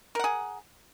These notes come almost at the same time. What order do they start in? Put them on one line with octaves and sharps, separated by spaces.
A#4 F#5 G#4